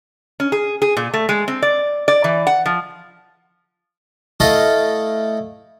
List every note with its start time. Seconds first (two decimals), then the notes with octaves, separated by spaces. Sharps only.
0.40 C#4
0.52 G#4
0.82 G#4
0.97 A#2
1.14 A3
1.29 G#3
1.48 C4
1.62 D5
2.08 D5
2.24 E3
2.47 F#5
2.66 F3
4.40 A3 E4 A4 D#5 F5